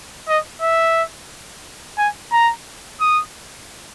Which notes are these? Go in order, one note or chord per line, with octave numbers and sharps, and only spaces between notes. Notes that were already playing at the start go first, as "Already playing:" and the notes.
D#5
E5
G#5
A#5
D#6